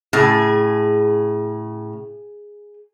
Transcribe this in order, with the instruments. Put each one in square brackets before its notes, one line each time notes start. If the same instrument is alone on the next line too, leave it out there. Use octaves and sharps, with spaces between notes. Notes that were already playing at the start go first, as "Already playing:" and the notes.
[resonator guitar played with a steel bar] A2 C#3 [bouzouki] G#4